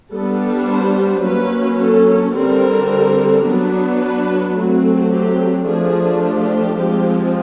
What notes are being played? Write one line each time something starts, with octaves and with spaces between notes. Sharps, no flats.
G3 B3 D4 A4
C5
F#3 A#3 C#4 B4
A4
D3 G3 C4 A#4
F#3 B3 D4
B4
F#3 A3 C4 F#4
G4
F3 A3 D4 G#4
G4
F3 G#3 C4